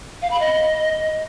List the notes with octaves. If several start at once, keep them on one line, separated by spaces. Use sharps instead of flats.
F5
B5
D#5